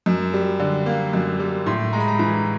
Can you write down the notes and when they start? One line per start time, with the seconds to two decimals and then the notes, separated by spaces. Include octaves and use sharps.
0.06 F#2
0.33 G3
0.60 D3
0.86 A#3
1.13 F#2
1.39 G3
1.66 A2 C6
1.93 G#3 A#5
2.00 B5
2.08 A#5
2.19 E3 A#5